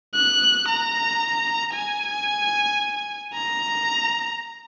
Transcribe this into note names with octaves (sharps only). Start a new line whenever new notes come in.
F#6
A#5
G#5
A#5